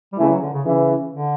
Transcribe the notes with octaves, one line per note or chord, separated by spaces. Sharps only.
G3
C#3 E3 A3
F#3
D3
C#3
C#3 E3
D3